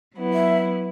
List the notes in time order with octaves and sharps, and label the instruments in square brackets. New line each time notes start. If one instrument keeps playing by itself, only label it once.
[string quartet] F#3 B3 E4
[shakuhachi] E5